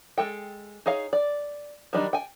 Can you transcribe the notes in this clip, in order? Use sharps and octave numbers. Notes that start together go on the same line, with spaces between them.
G#3 A4 G5
D#4 G#4 C#5 F5
D5
D#3 F#3 G3 D4 D#4
G5 G#5